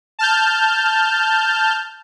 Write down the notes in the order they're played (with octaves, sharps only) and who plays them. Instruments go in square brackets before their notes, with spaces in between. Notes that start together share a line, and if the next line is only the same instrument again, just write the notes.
[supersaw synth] A5 F6 G6